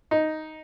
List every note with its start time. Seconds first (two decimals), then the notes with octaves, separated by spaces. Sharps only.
0.11 D#4